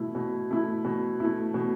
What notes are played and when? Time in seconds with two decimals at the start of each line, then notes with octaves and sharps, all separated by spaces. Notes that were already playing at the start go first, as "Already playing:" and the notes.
Already playing: B2 A3 E4
0.15 B2
0.51 A3 E4
0.85 B2
1.20 A3 E4
1.54 B2